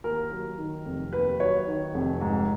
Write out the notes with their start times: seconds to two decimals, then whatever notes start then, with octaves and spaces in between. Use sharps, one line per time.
0.04 D#2 A#4
0.31 F#3
0.58 D#3
0.85 F1
1.13 D#2 B4
1.40 F#3 C#5
1.67 D#3
1.94 F1
2.21 G#2